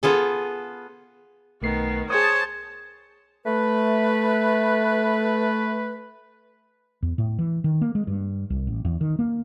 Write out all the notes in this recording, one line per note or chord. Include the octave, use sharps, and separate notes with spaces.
B3 F4 G#4 A4
B1 D#3 A3 B3 C7
G#4 C5 C#5 A5 D#6
A3 B4
E2
A2
E3
D#3
A#3
G#3
G2
C2
A1
E2
D#3
A#3